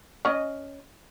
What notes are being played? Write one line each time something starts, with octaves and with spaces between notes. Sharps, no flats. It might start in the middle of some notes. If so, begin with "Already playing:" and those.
C#4 D#5